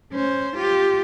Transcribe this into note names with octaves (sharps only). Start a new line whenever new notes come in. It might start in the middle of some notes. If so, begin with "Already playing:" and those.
C#4 C5
F4 G4